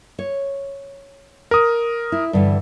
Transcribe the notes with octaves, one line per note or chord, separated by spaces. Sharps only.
C#5
A#4 D#6
E4
G2 D3 E3